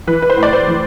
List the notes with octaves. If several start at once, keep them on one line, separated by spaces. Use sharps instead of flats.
E3 B4
B4
C5
A2
D5
C5
E3